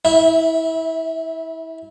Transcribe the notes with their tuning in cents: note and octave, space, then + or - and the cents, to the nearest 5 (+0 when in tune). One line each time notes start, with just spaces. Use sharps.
E4 -25 E5 +0